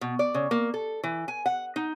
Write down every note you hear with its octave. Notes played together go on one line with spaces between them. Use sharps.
B2
D5
C#3
A#3
A4
E3
G#5
F#5
D#4